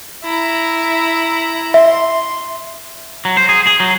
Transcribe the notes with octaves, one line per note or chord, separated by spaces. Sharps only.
E4 A#5
E5 C6
F#3
C5
G#4
G#4
F#3